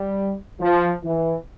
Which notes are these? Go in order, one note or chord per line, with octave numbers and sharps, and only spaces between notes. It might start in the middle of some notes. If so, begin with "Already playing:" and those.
Already playing: G3
F3
E3